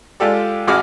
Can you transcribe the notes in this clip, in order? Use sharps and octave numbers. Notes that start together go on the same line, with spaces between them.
G#3 F4 G4 A4 D5
A1 E4 F#4 G#4 D6 F6